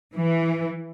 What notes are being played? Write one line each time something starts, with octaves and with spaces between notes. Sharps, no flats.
E3